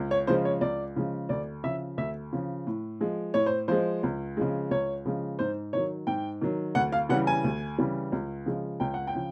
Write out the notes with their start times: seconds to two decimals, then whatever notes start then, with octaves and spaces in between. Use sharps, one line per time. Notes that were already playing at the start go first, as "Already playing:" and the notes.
Already playing: C#2
0.11 C#5
0.27 C#3 F3 G#3 C5
0.45 C#5
0.61 C#2 D5
0.96 C#3 F3 G#3
1.29 D2 D5
1.64 C#3 F3 E5
1.98 D2 E5
2.33 C#3 F3
2.67 A2
3.00 F3 G#3
3.34 A2 C#5
3.46 C5
3.68 F3 G#3 C5
4.03 C#2
4.37 C#3 F3 G#3
4.71 C#2 C#5
5.05 C#3 F3 G#3
5.39 G#2 C5
5.73 D#3 F#3 C#5
6.07 G#2 G5
6.41 D#3 F#3
6.75 D2 F#5
6.92 F5
7.09 C#3 E3 G3 F#5
7.27 G#5
7.44 D2
7.78 C#3 E3 G3
8.12 C#2
8.46 C#3 F3 G#3
8.80 C#2 G5
8.94 F#5
9.07 G5
9.15 C#3 F3